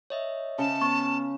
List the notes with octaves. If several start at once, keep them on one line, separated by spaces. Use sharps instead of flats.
C#5 D#5 E5
C#3 A5
B3 C#6